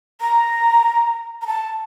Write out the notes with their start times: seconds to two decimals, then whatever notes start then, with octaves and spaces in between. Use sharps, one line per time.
0.21 A#5
1.42 A#5
1.47 A5